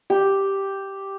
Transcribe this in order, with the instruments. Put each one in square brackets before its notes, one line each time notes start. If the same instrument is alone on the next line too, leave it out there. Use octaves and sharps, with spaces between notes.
[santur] G4